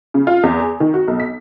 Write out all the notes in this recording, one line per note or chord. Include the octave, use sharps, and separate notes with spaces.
C#3
F4
E2
G#4
D#3
F#4
B1
B6